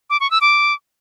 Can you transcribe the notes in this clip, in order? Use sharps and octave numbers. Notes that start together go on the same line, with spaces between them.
D6
C#6
E6
D6